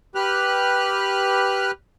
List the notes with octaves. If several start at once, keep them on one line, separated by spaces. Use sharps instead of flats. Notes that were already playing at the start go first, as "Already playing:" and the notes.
G4 B4 F6 F#6